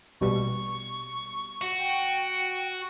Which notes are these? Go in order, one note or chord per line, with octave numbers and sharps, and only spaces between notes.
A#1 B2 G3 C#6
F#4
G5